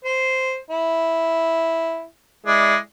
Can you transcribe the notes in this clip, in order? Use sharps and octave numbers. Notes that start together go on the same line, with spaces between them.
C5
E4
G#3 E4 D5